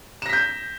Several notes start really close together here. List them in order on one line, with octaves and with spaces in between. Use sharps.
E7 A#6 B6 G6